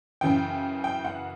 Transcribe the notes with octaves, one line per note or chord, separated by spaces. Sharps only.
F#2 C#3 E3 G5
G5
F#5